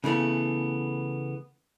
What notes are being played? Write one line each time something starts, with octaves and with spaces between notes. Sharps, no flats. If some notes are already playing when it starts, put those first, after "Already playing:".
C#3 E3 A3 B3